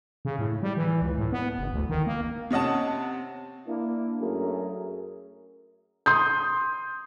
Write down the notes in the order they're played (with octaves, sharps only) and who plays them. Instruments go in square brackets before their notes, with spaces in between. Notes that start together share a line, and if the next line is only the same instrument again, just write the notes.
[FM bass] C#3
A2
G3
E3
C#2
A2
B3
F#1
D2
D#3
A#3
[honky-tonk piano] C3 C#4 D#5 F#5 A5
[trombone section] A#3 D4 E4
F#2 A3 G#4 A#4
[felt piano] C6 D#6 G6